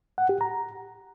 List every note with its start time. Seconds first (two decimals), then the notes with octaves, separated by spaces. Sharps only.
0.18 F#5
0.29 G4
0.41 A#5